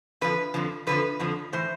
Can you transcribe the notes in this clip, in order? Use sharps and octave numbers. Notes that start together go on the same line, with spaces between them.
F2 D3 F3 B4
F2 D3 F3
F2 D3 F3 B4
F2 D3 F3
A2 E3 C5